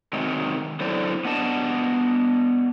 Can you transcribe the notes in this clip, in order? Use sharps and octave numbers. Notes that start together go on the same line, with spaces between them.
C3 D#3 F#3 G#3
D3 F#3 E4 A4 C5 D5
B3 D4 D#5 G#5 A5